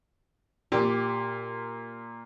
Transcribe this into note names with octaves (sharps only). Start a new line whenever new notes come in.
A#2 G4